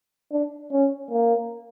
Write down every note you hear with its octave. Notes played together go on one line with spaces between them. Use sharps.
D4
C#4
A#3